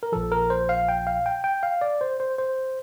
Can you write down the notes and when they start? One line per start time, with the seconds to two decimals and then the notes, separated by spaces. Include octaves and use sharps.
0.03 A#4
0.12 A#1 A#2 F3 A4
0.32 A#4
0.50 C5
0.69 F5
0.89 G5
1.07 F5
1.26 G5
1.44 G5
1.63 F5
1.81 D5
2.01 C5
2.20 C5
2.38 C5